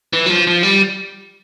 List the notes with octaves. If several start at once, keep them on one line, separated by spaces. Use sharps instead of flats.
E3
F#3
F3
F3
G3